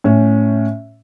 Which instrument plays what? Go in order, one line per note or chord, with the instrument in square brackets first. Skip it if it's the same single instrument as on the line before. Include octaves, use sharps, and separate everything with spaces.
[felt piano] A2 C#4